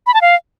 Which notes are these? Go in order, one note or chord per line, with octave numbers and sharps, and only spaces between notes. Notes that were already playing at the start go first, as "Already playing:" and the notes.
B5
A5
F5